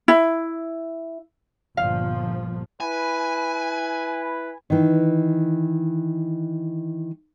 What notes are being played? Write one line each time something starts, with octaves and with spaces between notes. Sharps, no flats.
E4
G1 A#2 F3 F5
E4 B4 G#5
D#3 E3